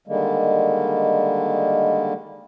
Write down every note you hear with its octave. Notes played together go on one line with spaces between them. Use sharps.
D3 D#3 G3 G#3 A#3